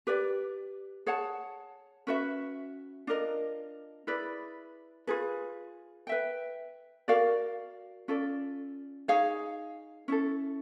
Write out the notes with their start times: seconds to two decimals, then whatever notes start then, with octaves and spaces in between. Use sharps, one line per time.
0.07 G4 B4 D5
1.06 G#4 C#5 F#5 A5
2.07 C#4 F#4 B4 E5
3.07 D4 F4 A#4 D#5
4.07 E4 G#4 B4 D5
5.07 F4 G#4 B4
6.07 B4 E5 G5
7.08 F#4 A#4 D5 F5
8.08 C#4 F4 A4 D5
9.08 D#4 G#4 C#5 F5
10.08 C#4 E4 A4